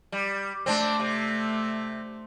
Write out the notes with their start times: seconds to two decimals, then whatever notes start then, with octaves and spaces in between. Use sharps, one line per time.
0.12 G3
0.66 A3 C4 D4
1.00 C3